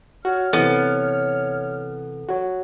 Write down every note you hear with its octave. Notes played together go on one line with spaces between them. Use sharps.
F#4 C#5 F6
C3 E3 B3 A4
F#4 C#5